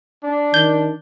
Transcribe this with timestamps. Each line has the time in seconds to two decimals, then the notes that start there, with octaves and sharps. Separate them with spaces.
0.23 D4
0.54 D#3 G6